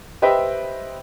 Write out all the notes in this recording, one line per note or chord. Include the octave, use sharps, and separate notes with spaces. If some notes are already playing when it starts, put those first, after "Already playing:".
G4 B4 C5 D#5 E5 G5